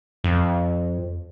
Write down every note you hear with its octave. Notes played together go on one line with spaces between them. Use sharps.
F2